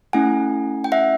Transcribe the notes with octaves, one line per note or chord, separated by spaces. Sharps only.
A3 C#4 E4 F#5 G#5
G5
E5 F#5